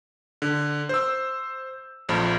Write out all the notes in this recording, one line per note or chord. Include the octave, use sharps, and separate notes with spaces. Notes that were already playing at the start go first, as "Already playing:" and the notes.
D3
C5 E6
A#1 F2 F3